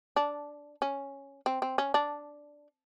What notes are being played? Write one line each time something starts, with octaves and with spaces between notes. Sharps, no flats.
D4
C#4
C4
C4
C#4
D4